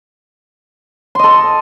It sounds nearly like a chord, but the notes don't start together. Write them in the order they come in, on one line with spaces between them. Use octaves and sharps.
C6 D#5 A4